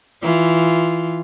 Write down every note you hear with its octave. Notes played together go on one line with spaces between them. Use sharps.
E3 F4